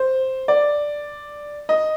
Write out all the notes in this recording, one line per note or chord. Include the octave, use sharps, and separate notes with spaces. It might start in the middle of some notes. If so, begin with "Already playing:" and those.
Already playing: C5
D5
D#5